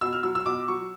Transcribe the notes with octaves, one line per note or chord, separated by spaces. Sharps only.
B2 E6
F6
F#3 E6
E6
B2 D6
F#3 C#6